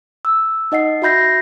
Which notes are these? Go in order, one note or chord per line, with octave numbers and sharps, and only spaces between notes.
E6
D#4 D#5 F#5 C7
F#4 E5 B5 G6 A#6 C7